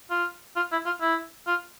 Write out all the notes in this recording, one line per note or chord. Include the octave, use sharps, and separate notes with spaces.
F4
F4
E4
F4
E4
F4